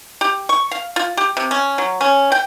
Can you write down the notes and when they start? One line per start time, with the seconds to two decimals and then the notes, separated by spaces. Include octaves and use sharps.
0.21 G4
0.49 C#6
0.71 F5
0.96 F4
1.17 G4
1.37 C3
1.51 C#4
1.78 F#3
2.01 C#4
2.32 G5